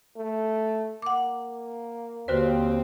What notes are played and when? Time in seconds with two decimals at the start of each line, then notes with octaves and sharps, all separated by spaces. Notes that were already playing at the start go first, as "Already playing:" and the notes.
0.16 A3
1.02 A#3 F#5 D6
2.28 D#2 D3 C4 F#4 B4